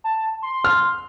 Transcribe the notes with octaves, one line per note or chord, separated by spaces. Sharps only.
A5
C6
F6